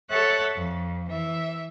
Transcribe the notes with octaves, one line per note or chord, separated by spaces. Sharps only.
A4 C#5 E5 F#5 F#6 A6
F2
E3 E5